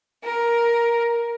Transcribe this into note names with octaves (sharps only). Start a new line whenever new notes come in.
A#4